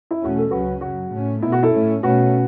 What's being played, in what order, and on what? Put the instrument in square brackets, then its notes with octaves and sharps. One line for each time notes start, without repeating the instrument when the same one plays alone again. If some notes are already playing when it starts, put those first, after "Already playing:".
[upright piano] E4
[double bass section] E2 B2 A3 C#4 [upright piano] F#4
[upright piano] A4
[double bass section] C#2 C#3 F#3 C#4 [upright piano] F#4 B4
[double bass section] F#2 C#3 F#3 [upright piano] F#4
[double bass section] A2 A3 C#4
[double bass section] B3 [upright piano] E4
[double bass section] B2
[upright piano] F#4
E4 A4
[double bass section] A2 A3 C#4
[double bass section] B2 A3 C#4 [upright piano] F#4 B4